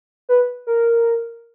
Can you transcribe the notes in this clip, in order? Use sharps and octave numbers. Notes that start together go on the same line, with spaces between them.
B4
A#4